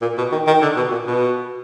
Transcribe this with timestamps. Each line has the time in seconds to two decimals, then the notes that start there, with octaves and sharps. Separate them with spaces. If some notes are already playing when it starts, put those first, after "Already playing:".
0.01 A#2
0.17 B2
0.32 D#3
0.47 D#3
0.62 D3
0.76 B2
0.91 A#2
1.07 B2